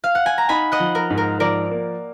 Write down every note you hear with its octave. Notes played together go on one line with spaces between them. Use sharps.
F5
F#5
G#5
A#5
D#4 G#5 B5
D#5 F#5
F3
A#4
G#2
A#4
F3 A#4 D5
A#3